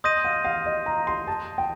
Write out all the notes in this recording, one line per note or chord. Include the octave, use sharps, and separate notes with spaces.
D#5 C6 D#6 G6 A#6 D#7
F5
F5
D#5
A#5
C6
A5
G5